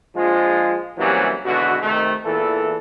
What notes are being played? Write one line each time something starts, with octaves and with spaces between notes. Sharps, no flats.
A#1 F3 G#3 F4
C3 E3 F#3 G3 A#3 C#4
G#1 B2 D3 E3 F#4
C3 D#3 A3
E2 A#2 E3 A4